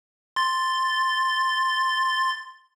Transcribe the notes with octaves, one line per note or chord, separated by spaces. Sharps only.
C6 A6